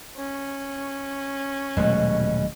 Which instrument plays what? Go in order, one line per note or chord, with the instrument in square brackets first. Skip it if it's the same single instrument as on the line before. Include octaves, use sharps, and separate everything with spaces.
[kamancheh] C#4
[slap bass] D#1 F#3 A3 [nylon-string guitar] D2 B2 G#3